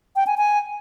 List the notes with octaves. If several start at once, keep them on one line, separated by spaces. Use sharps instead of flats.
G5
G#5
G#5